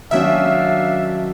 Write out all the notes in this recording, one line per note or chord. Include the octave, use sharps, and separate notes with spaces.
D#3 F#3 C#4 D4 E5 F5